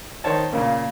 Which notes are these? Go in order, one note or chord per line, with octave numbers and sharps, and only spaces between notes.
D#3 C5 C#5 A5
A#2 C#3 A#3